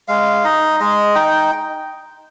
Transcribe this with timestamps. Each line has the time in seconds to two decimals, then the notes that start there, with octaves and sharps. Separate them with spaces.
0.08 G#3 F5
0.44 D#4 D#5
0.80 G#3 D#5
1.15 D#4 G5